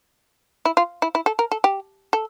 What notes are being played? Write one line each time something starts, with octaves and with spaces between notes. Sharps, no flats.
E4
F4
E4
E4
A4
A#4
A4
G4
A4